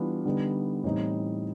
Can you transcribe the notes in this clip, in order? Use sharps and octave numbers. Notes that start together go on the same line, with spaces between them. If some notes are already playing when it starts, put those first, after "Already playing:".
Already playing: E3 G3 B3 D4 F4
D3 G3 B3 D#4
A2 E3 G3 C4 D#4